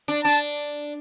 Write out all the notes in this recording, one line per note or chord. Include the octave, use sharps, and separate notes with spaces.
D4
D4 A5